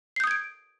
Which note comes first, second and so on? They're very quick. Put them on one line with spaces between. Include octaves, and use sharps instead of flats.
C7 G6 D#6 G#6 D7